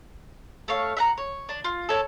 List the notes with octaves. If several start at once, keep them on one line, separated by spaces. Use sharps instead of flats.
A3 C#5 F5
E5 F#5 A#5
C#5
D4
F4
A4 C#5 D5